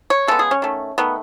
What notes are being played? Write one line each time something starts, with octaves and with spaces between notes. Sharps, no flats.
C#5
C#3 G#3 B3 A4
G#4
C#4
D#3 A3
D#3 A3 B3